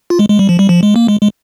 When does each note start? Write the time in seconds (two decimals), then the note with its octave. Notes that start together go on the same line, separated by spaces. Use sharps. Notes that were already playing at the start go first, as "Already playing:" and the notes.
0.10 F4
0.19 G#3
0.30 G#3
0.39 G3
0.49 F3
0.59 G3
0.69 F3
0.83 G#3
0.96 A#3
1.08 G#3
1.21 G#3